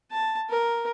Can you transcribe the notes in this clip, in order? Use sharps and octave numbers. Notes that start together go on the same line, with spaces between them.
A5
A#4